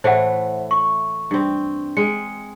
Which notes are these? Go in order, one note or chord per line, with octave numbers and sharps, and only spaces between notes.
A2 E3 A3 C5 F#5
C#6
G2 C4
G#3 C#7